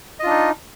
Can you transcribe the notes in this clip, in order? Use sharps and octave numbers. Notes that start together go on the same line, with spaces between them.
D4 D#4 F4 D#5